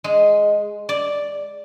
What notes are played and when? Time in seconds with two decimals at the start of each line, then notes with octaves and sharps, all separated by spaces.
0.04 G#3
0.89 D5